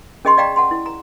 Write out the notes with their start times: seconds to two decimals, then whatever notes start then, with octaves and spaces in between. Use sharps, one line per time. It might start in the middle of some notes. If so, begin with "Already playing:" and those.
0.25 C#4 G#4 D#5 G5 C6 C#6
0.37 D5 D#5 F5 G5 A#5 C#6
0.56 F#5 A5 C6
0.71 E4
0.86 A#5